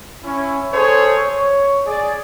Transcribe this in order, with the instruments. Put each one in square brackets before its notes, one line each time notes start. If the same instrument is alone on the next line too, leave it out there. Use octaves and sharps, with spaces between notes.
[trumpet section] C#4 E4
G#4 A4 C5 C#5
C#5
G#4 D5